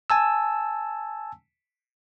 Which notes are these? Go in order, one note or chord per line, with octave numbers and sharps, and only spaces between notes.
G#5 A5 E6